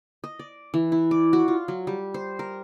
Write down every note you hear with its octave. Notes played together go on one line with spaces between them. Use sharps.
D#5
D5
E3
E4
D5
F#4
F4
F#3
G3
C5
A#4